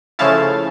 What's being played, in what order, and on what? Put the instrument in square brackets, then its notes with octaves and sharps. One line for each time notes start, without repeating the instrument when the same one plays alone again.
[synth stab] C#3 F3 A3 C#4 E4 F5 A5